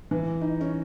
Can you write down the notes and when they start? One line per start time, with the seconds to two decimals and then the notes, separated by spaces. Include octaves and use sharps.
0.11 E3
0.41 D#4
0.61 C#4